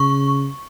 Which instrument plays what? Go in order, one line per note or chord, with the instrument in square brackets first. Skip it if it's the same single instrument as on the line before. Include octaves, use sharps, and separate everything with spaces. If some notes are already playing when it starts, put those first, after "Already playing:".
Already playing: [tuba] C#3 [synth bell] C#6